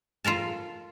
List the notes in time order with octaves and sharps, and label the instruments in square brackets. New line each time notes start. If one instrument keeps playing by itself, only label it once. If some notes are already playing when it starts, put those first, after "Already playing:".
[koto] F4 A4 A#4 A5